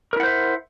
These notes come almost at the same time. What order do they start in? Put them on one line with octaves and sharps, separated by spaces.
A#4 E4 F#5 C5 E5